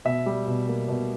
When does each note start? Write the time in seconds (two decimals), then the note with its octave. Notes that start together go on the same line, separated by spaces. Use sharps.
0.05 B2 E5
0.26 G3
0.47 B2
0.68 A#3
0.88 B2